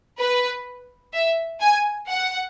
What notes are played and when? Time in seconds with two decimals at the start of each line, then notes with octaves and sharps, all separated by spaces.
0.19 B4
1.14 E5
1.61 G#5
2.09 F#5